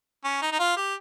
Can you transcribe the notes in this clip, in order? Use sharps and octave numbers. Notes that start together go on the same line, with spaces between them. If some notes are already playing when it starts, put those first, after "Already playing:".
C#4
D#4
D#4
F4
G4